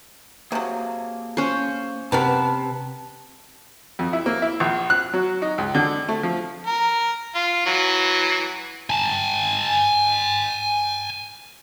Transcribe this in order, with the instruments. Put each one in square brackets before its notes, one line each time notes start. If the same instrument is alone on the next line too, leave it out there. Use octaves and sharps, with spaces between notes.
[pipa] C3 F#3 [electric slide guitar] A#3 G#4
[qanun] C#4 C5
[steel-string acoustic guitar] C3 [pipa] B3 A#4 B4 [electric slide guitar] A5
[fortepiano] F2
E4
A#3
E4
A#1
F#6
F#3
D#4
C#2
D3
A3
F3
[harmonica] A#4
F4
E3 F#3
[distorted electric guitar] G#5 A5